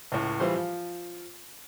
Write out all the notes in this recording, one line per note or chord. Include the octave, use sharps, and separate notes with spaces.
C#2 A2
E3 G3 F4 C5
F3